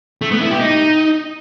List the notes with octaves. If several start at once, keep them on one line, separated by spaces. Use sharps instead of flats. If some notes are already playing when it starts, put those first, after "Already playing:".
A3
B3
E4
G4
D#4